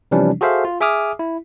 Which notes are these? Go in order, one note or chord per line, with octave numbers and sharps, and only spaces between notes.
C3 E3 F3 G3 C#4 D4
F#4 G#4 A4 C5 E5 F5
F4
G#4 E5 G#5 D6 D#6 F6
E4